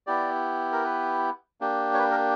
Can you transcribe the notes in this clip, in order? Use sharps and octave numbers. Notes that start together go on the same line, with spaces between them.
B3 E4 G4 D5
A#4
B4
A#3 D4 G4
C#5
B4
A#4